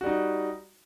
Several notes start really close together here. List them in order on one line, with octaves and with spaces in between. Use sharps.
F#4 G3 D#4